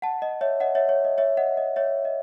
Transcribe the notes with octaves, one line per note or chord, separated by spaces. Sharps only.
F#5 A5
D#5
C#5 E5
D#5 F#5
C#5 E5
C#5
D#5
C#5 E5
D#5 F#5
D#5
C#5 E5
D#5